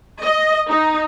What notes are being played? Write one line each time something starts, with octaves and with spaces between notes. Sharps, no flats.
D#5
D#4